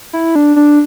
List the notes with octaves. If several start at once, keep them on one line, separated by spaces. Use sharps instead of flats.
E4
D4
D4